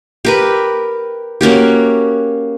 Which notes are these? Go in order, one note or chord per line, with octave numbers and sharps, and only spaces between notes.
G4 A#4 B4
A#3 C#4 F#4 G4